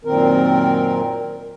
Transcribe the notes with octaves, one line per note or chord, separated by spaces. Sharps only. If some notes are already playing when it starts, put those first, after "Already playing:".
F#2 A#2 D#3 C4 A#4